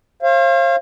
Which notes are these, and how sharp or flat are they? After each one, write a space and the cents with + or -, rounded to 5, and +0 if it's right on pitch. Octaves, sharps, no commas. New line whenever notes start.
C5 +45 F5 -25